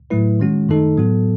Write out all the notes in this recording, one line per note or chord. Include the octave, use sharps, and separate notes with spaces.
A2 F#3 A3 E4 B4
D#3 G#3 C#4 F#4
F#2 D#3 A3 D#4 A4
A2 F#3 B3 F#4 A4